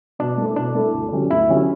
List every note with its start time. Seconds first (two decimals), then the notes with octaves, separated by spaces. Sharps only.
0.19 B2 D4
0.37 A3 E4 A4
0.56 B2 D4
0.75 A3 E4 A4
0.93 D2
1.12 D3 F#3 C#4 G4
1.30 D2 E4
1.49 D3 F#3 C#4 G4